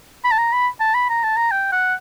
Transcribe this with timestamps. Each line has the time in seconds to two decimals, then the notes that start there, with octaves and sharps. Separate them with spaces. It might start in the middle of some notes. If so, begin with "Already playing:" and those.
0.24 B5
0.32 A5
0.38 A#5
0.53 B5
0.80 A5
0.94 B5
1.09 A#5
1.24 A5
1.37 A#5
1.51 G5
1.72 F#5